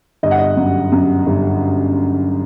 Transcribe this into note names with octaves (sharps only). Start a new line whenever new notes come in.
G1 D#5
F#5
D#5
F#2
F#2
G1